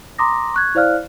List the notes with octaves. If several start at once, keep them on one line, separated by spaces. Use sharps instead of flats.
A#5 C6 D6 D#6 A#6
C#6 F#6 G#6
E4 C5 D5 F5 F6 F#6